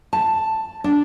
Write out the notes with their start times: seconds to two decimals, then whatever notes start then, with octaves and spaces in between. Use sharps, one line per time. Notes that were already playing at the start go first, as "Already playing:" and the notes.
0.13 A5
0.84 D4